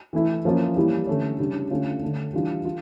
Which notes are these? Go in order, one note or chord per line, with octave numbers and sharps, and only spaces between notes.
E3 A3 E4
F3 A#3 C#4 F4
E3 G3 A#3 E4
D3 A3 C#4
C#3 G3 D4
D3 A3 C#4 F4
D3 A3 D4
E3 G3 D4 F4
F4